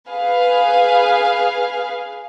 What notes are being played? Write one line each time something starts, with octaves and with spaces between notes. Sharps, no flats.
G#4 B4 F5